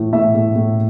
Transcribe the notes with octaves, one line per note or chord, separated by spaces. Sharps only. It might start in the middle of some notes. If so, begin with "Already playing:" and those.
Already playing: A2 E3
A2 E5
A2
A2